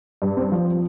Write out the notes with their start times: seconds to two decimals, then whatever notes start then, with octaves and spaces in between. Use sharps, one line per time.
0.22 G2
0.37 C4
0.52 F3